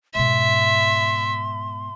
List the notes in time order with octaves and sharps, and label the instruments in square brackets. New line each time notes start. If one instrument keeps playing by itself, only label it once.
[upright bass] G#2 B2 [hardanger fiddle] E5 [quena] C6